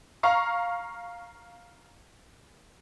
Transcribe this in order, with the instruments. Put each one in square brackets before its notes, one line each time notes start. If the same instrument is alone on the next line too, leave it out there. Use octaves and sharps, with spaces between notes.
[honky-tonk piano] F5 A#5 C#6